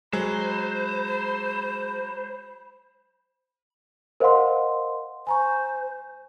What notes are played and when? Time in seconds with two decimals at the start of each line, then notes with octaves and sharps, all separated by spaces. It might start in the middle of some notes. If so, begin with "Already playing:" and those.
0.13 F#3 G#3 C5 B5
4.20 A#4 C5 D#5 F5 F#5 C6
5.27 C5 G#5 A#5 C#6